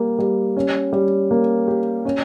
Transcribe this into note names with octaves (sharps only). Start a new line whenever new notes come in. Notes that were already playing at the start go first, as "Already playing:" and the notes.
Already playing: G3 A#3
G3
C#4
G3
A#3
G4
C#4